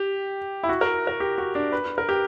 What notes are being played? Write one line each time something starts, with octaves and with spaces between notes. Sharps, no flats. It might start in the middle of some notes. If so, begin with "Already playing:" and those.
Already playing: G4
E4
F#4
A#4
A#4
G4
F#4
D4
B4
A#4
G4